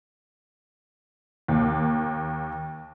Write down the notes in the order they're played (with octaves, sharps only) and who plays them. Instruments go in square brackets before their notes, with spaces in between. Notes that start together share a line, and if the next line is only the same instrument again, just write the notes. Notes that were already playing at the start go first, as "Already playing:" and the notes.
[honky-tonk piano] D#2